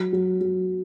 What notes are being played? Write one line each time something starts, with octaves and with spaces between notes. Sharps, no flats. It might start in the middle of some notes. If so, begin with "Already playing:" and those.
Already playing: F#3
F#3
F#3